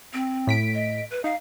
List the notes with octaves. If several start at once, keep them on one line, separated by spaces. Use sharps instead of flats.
C4
A2 B6 D7
D#5
B4
D#4 F5